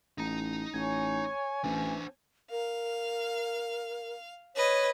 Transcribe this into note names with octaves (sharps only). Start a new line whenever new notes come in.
A1 D#4 A#5
A1 C#5 G#5
A1 E3 D4 C5
A#4 F5
B4 C#5 D#5